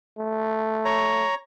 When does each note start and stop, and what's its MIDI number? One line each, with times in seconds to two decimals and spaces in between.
0.18 1.25 57
0.85 1.35 73
0.85 1.35 82